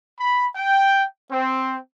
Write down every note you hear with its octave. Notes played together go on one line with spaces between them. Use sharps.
B5
G5
C4